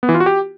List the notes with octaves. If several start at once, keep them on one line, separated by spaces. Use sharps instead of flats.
B3
E3
F4
F#4
G4